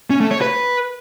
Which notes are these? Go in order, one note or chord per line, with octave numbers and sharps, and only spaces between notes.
C#4
A3
C#5
B4